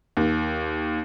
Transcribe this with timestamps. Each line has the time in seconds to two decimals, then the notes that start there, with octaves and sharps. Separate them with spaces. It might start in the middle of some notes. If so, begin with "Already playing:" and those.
0.17 D#2